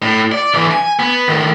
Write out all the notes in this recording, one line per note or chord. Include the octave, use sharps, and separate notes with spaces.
A2
D5
B1 E3
G#5
B3
A2 D#3